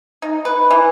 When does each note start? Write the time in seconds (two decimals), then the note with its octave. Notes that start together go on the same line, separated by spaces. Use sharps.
0.22 D#4
0.45 B4
0.71 E3